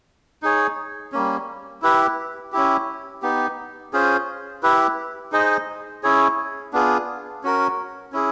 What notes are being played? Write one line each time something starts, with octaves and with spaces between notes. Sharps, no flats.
D#4 G#4 C#5
G3 A#3 C#4
E4 G4 B4
C#4 E4 G4
B3 D#4 G4
C#4 F4 G#4 C5
E4 G4 B4
D#4 G#4 C5 D#5
C#4 E4 G#4 C#5
B3 D4 F4 G#4
C#4 F#4 A#4
C#4 E4 G#4